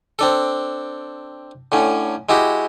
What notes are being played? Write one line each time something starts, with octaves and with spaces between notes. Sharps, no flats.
C4 D4 A4
A2 D3 C#4
G#3 E4 F#4 G4